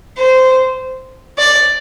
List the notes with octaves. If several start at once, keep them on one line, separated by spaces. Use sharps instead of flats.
C5
D5